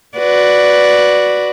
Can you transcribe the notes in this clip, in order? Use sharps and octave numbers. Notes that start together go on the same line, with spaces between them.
F#4 B4 D5